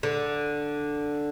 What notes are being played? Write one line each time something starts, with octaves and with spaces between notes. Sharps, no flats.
D3